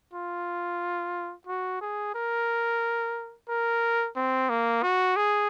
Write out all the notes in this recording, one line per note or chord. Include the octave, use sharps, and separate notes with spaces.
F4
F#4
G#4
A#4
A#4
C4
A#3
F#4
G#4